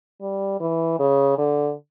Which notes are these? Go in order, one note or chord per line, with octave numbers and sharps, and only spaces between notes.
G3
E3
C#3
D3